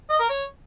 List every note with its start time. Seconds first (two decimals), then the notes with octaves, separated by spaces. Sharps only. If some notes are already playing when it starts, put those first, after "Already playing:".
0.10 D#5
0.20 A#4
0.29 C#5